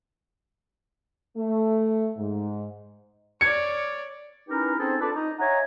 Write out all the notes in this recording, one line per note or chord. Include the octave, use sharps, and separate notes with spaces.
A3
G#2
C#5 D5 G#6 C#7
C#4 D#4 E4 G4 A#4 B4
C4 C#4 D#4 G#4 A4 C5
D4 F4 A4 B4 D5 A5
D#4
C#5 D#5 E5 F#5 G#5 A#5